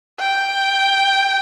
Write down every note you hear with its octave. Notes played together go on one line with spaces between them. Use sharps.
G5